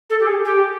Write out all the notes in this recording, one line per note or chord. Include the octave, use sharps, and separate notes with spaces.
A4
G4
G#4
G4